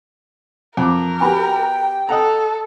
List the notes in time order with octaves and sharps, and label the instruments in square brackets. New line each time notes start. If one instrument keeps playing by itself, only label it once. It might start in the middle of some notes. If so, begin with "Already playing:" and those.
[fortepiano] F2 D6 [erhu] A#4
[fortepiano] B3 F#4 G4 [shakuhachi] G5 [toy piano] G#5 B5
[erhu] A4 [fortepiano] D#5 F#5 A#5